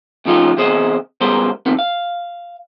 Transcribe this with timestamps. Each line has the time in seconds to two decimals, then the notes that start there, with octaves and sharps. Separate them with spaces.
0.25 A2 C#3 F3 D#4 F4 G4
0.57 E2 C3 G#4 C5 D#5
1.21 C#2 G3 B3 G#4 A#4 C5
1.66 F2 C3 D#3 B3
1.79 F5